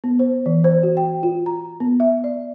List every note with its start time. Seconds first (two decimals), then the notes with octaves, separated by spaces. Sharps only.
0.04 B3
0.19 C5
0.46 E3
0.64 C5
0.83 F#4
0.97 G5
1.23 F4
1.46 A#5
1.80 B3
2.00 E5
2.24 D5